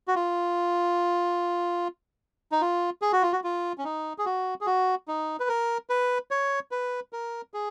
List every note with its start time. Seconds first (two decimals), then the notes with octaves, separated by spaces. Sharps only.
0.08 F#4
0.15 F4
2.52 D#4
2.61 F4
3.02 G#4
3.12 F#4
3.22 F4
3.33 F#4
3.44 F4
3.78 C#4
3.84 D#4
4.18 G#4
4.26 F#4
4.61 G#4
4.66 F#4
5.08 D#4
5.40 B4
5.49 A#4
5.90 B4
6.31 C#5
6.71 B4
7.13 A#4
7.54 G#4